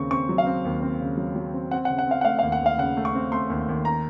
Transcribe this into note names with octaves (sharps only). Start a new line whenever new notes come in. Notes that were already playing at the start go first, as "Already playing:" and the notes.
Already playing: D#2 C#3 C4 C#6
C4 C#6
F#3
F5
C4
D#2
C4
C#3
F#3
F#3
C4
C4 F#5
F#5
C#3
F#5
C4 F5
F#5
A3 F5
F5
D#2
F#5
D#2 F5
C#3 F#5
A3
C#6
C4
A3 C6
D#2
D#2
A#5